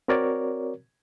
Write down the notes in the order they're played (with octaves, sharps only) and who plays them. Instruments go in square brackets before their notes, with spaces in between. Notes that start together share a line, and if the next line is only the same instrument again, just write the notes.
[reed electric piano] C4 F#4 A#4 C#5 D5